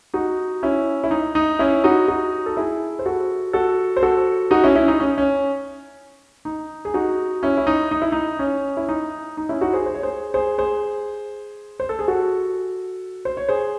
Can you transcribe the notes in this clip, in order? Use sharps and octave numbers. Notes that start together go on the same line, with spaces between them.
D#4 F#4
C#4 E4
E4
D#4
D#4
C#4 E4
D#4 F#4
D#4 F#4
A4
E4 G#4
C5
F#4 A4
F#4 A4
C5
F#4 A4
D#4 F#4
C#4 E4
C#4 E4
D#4
C#4
C#4
D#4
G#4
D#4 F#4
C#4 E4
E4
D#4
D#4
E4
D#4
C#4
E4
D#4
D#4
C#4 E4
D#4 F#4
G#4 C5
C5
C#5
G#4 C5
G#4 C5
G#4 C5
C5
A4
G#4
F#4 A4
C5
C#5
G#4 C5